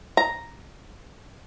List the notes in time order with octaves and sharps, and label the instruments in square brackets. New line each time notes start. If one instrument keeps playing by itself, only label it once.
[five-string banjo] A#5